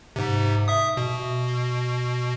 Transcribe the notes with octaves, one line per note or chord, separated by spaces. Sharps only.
G#2 C3
E5 D#6
B2